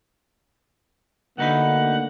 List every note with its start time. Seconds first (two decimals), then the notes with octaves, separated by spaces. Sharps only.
1.38 D2 D3 A3 A#3 D#4 B4 F#5